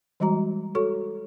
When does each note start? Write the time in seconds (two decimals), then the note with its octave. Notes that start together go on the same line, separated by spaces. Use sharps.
0.20 E3 G3 G#3 F#4 A#5
0.75 F#4 A4 C#5 C#6